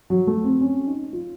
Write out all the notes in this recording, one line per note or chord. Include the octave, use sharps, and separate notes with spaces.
F#3
A3
C4
C#4
D#4
F4